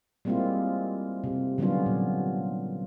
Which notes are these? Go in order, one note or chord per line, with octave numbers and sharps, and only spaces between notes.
G3 G#3 A#3 C4 E4 F4
C3
D3 F#3 G3 B3 C#4 F4
A#2